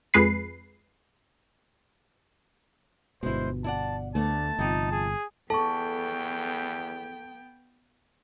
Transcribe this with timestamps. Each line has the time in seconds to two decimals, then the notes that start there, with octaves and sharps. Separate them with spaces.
0.14 F2 G#3 B4 C7
3.23 G1 B2 G#3 E4 C5
3.64 E4 D5 F#5 A5
4.15 D2 A3 B3 D4 A5
4.59 G1 C3 F3 D#4
4.91 G#4
5.50 E2 B3 A4 G5 A5 C#6